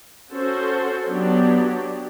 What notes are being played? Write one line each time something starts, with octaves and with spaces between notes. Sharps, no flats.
C#4 F#4 A4 C5
F#3 B3 D4 G4